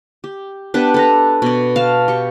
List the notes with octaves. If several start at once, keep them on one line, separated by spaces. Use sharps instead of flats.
G4
B3 D4 G4 B4
A4 B4 A#5
B2 D5
F5 A5
G4 C#6